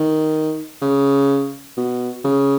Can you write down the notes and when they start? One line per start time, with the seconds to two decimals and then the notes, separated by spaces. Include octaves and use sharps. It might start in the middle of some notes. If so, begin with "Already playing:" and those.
Already playing: D#3
0.82 C#3
1.77 B2
2.24 C#3